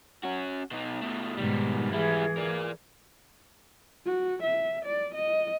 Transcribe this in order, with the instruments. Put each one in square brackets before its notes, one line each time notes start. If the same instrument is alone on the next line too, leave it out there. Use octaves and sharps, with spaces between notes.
[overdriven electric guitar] C#4 F#4
B2 D#4
B2 A3
[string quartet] G#2 B2 [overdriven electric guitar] D#3 G3
[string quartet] E3 G#4 [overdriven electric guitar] G3 E4
[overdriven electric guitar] A#4 D5
[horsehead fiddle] F#4
E5
D5
D#5